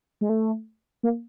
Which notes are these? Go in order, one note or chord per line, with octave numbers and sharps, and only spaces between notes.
G#3
A3
A#3